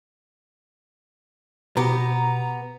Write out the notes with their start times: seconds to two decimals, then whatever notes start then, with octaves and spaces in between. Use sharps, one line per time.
1.77 B2 B3 G4 A#5